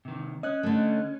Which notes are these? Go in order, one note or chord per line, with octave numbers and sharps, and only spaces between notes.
C3 D#3
C#4 D#5 F#6
D3 A3